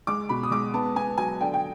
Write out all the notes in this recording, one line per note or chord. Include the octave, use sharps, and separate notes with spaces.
G#3 D6
B2 B5
D#6
G#3 D6
B3 A5
B3 G#5
F#3 G#5
D3 G5
G5